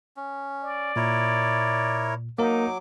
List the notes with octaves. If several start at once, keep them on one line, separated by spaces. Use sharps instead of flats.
C#4
D5
A#2 E4 A#4 C#5
F#3 A#3 D#4 A#4 D6